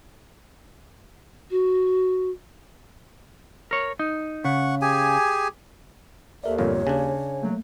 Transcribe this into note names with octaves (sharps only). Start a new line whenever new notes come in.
F#4
A#4 C#5
D#4
C#3 F#5 C#6
G4 G#4 G#5
D#2 A4 A#4 D5 E5
G1 F2 A#2 C#5
C#3 D4 G#5
F#3 A3 A#3